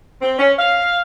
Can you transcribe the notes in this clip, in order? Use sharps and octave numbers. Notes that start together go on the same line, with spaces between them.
C4
C#4
F5